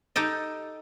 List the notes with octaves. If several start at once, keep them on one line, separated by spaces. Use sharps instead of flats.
D#4 G4 A4 D#5